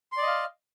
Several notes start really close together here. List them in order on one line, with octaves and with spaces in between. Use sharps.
C6 D5 D#5 F5